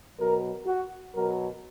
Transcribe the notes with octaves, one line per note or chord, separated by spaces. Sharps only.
B2 F#3 A#4
F#4
B2 F#3 A#4